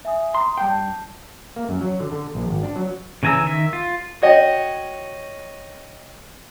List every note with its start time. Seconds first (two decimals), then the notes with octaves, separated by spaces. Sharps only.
0.05 E5 G#5 D#6
0.34 A#5 C6 D#6
0.57 G2 G5 A5 G6 C7
1.56 A#3
1.69 F#2
1.81 F#3
2.00 D3
2.12 D3
2.35 A#1
2.49 G#1
2.63 D4
2.76 F#3
3.23 C#3 E3 G#5 A#5 E6
3.44 D#3 E5
3.73 F4
4.22 F#4 C#5 D#5 G5